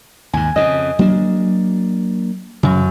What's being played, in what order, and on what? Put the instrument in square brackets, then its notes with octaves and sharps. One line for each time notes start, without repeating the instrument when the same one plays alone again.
[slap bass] D#2 G#2 [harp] G#5
[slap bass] F2 C#3 [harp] D#5
[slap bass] F#3 A#3 D4
[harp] F#2 [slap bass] C#3